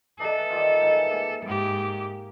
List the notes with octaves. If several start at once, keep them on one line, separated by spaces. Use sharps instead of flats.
E3 D4 D#4 A4
D#3 G3 F4
G#2 E3
A#3
G#2 G4